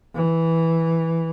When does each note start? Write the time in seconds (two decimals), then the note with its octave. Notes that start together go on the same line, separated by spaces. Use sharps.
0.15 E3